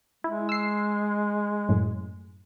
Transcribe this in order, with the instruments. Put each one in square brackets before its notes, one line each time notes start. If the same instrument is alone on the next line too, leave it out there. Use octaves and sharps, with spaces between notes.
[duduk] G#3 [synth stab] E4
[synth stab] E6 C7
F#2 A2